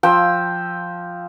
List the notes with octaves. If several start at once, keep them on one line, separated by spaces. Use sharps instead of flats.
F3 G5 E6